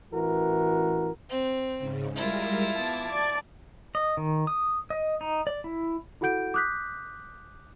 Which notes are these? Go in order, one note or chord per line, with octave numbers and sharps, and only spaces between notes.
A1 E3 F#4 A#4
C4
G#2 C#3
G3 G#3 E4 F4 A#4
B3 A5 D6 G#6
D5 A5
D#5
D#3
D#6
D#5
D#4
D5
E4
E4 F#4 A4 F#5 G6 D7
D6 D#6 F#6 G6 B6